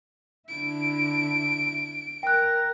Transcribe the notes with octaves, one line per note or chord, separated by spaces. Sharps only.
D3 E4 D7
A#4 G5 F#6